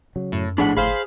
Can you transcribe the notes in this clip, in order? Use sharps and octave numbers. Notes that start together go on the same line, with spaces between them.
C#3 F#3
F#2 A2
A#1 A2 F3 D4 G#4 F#5 B5
G1 G#4 C5 F5 B5